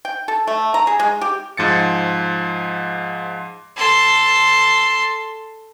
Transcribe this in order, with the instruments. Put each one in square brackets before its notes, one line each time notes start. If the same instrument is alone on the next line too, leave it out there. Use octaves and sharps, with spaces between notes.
[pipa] G5
A4
A3
A#5
G#4
G#3
G4
[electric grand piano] G#2 F3 A6 C#7
[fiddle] A4 C6